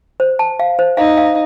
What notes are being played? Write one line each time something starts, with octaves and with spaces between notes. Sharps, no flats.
C5
A5
F5
C5
D#4 F5
F5